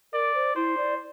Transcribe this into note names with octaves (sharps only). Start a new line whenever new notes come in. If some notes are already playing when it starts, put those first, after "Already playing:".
A#4 D5
C5
E4 C5
D5